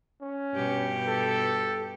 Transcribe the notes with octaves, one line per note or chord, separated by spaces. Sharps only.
C#4
G2 B2 G4
A4